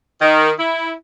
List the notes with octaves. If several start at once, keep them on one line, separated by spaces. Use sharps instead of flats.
D#3
E4